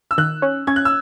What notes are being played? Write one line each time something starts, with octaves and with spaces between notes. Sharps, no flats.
E6
D#3 F#6
C#4
C#4 G#6
F#6
E6